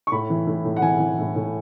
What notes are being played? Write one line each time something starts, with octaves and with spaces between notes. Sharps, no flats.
C#6
A2 B5
E3
A2
A2
F#5
E3 G#5
E3
A2
A2